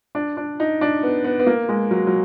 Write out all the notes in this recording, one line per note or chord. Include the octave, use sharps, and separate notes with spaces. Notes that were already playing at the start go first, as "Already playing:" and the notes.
D4
D4
D#4
D4
B3
B3
B3
A#3
G#3
F#3
F#3